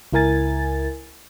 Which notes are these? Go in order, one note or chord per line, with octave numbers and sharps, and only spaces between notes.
C#2 E4 A#4 G#5 A6